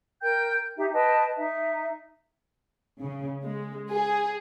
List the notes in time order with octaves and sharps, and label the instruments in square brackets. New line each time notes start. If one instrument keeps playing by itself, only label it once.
[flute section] A#4 G5 G6
D#4 G4 E5
B4 D#5 G5 A5
D#4 E5
[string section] C#3
G#3
G#4